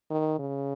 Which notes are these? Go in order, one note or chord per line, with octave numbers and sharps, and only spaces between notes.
D#3
C#3